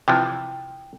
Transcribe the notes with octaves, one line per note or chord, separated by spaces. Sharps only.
C3 E3 F3 G5